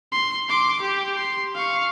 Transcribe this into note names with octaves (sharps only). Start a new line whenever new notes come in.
C6
C6 D6
G4
C6
F5 C#6